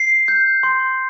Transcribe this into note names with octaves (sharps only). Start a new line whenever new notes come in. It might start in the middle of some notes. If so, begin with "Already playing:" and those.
Already playing: C7
G6
C6